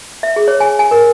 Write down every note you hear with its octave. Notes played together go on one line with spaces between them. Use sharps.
E5
G#4
C#5
G#5
G#5
A#4